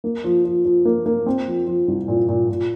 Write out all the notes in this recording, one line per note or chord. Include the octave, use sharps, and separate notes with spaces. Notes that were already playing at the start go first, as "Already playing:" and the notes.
A#3
F3
F3
F3
A#3
A#3
C4
F3
F3
C2
A#2
A#2
A#2